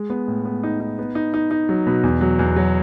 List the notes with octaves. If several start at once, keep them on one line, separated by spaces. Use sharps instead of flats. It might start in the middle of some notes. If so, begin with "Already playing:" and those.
Already playing: G#3
B3
A2
B3
D#4
D#4
B3
D#4
D#4
D#4
F#3
B2
E2
F#3
E2
F#3